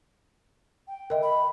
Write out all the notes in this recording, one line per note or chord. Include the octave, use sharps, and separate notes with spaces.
G5
A#4 D#5 E5
B5